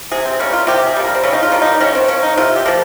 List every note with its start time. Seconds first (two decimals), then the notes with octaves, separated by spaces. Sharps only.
0.11 C3 G#4
0.26 C4
0.39 G3 A#3 C#4
0.53 F4
0.67 C3 G4
0.87 G#4
0.96 G3 A#3
1.05 A#4
1.15 C4
1.23 C#3 C#4
1.33 D#4
1.43 F4
1.52 G3 A#3
1.62 D#4
1.81 D#3 C#4
1.95 C4
2.08 A#3 C#4
2.23 D#4
2.37 C3 F4
2.56 G4
2.66 F3 A#3